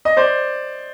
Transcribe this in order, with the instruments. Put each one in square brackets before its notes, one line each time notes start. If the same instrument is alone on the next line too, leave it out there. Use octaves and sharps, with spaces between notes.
[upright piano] D#5
C5 D5